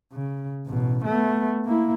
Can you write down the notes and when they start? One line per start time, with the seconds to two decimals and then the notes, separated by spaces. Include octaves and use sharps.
0.13 C#3
0.66 A1 B2
1.05 A3 B3
1.65 A#3 E4